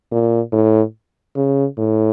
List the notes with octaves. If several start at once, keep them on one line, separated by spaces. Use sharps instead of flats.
A#2
A2
C#3
A2